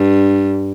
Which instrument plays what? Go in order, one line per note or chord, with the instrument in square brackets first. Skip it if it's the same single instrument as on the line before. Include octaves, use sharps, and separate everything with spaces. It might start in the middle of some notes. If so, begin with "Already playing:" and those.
Already playing: [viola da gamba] G2